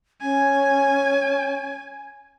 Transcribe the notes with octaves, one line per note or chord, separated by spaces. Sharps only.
C#4 G#5